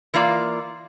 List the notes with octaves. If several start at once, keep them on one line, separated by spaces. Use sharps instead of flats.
E3 A#3 F4 D5